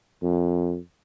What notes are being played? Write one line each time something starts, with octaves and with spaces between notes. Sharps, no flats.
F2